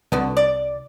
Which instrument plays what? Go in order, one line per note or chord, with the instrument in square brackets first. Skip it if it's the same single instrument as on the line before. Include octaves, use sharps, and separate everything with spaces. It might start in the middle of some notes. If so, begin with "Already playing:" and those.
[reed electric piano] C2 [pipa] D3 B3 F#4
[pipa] D5